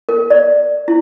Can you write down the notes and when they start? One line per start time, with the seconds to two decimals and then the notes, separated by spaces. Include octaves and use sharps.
0.09 A#4
0.30 D5
0.88 E4